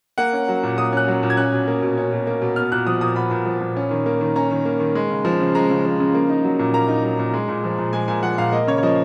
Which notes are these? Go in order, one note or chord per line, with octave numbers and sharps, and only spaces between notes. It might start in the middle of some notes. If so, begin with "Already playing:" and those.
A#3 F#5
C#4
F#3
A#2
A#3 D#6
C#4 F#6
F#3
A#2
G#6
C#4 F#6
B2
A#3
B2
C#4
B2
A#3
B2
B3 F6
A#2 F#6
F3 D#6
A#2 D#6
B3 B5
A#2
F3
A#2
C#4
D#3
A#3
D#3
C#4 A#5
D#3
A#3
D#3
G#3
C#3
F3
C#3
G#3 A#5
C#3
F3
C#3
A#3
D#4
F#3
A#2
A#3 A#5
D#4
F#3
A#2
G#3
A#2
F3
A#2
G#3 G#5
A#2 G#5
F3 F#5
A#2 F5
A#3 D#5
C#3 C#5
C#5
F3 D#5